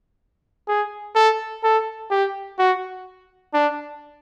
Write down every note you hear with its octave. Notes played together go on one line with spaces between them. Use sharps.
G#4
A4
A4
G4
F#4
D4